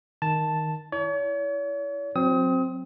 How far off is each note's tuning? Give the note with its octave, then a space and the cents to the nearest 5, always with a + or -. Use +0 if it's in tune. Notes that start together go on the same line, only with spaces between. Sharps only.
D#3 +0 A5 +0
E4 +0 C#5 +40
F#3 -25 C4 +0 D#6 +35